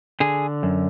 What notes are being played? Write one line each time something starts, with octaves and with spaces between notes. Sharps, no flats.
D3 G#4
F#2